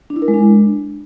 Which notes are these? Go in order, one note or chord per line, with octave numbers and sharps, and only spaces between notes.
D4
E4
A#4
G#3
D4